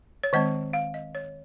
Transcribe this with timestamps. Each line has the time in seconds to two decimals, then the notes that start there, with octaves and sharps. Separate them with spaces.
0.23 C#5
0.33 D#3 G#3 C4 D#5
0.73 F5
0.94 D#5
1.15 C#5